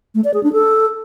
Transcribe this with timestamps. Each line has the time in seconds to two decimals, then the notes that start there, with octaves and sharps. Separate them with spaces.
0.15 A3
0.24 D5
0.34 G#4
0.43 D4
0.53 A4